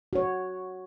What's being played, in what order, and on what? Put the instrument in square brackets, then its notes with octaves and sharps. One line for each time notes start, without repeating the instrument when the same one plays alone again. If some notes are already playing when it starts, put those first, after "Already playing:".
[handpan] F#4 C#5